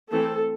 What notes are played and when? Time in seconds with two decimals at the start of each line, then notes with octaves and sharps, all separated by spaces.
0.11 E3 A3 C4 A4